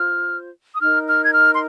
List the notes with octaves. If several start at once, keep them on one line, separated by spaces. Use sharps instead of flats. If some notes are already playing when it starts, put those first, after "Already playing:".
Already playing: F4 C5 F6
D#6
D#4 A#4 F6
F6
G#6
F6
C6